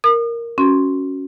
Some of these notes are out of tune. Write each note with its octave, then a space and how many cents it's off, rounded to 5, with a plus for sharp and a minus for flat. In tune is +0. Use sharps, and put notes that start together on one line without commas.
A#4 +0 D#6 -40
C#4 +0 F#4 +0 C6 +0